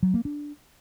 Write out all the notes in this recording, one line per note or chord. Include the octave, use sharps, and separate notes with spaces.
F#3
A#3
D4